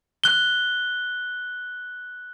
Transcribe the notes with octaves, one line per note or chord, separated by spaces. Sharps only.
F#6 G7